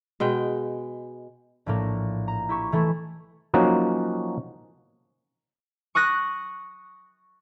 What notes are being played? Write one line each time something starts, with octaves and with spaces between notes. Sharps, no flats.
B2 G#3 G5
A#1 A2 A#3
A#5
E4 G4 C#6
E3 A3 E4
F3 F#3 A#3 C#4 D#4 F#4
C#6 D#6 F#6 A#6